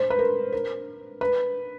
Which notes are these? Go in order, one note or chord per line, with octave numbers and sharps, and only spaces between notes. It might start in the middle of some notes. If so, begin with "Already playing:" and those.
Already playing: C5
B4
A#4
A#4
B4